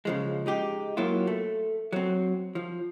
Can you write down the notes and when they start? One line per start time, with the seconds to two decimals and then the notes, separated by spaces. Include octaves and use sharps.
0.05 C#3 F3 G#3
0.46 G#3 D#4 G4
0.97 F#3 A#3 E4 F4
1.27 A3
1.92 F#3 C4
2.55 F3